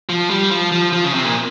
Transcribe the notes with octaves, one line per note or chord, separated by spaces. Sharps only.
F3
G3
F3
F3
F3
C#3
C3
A#2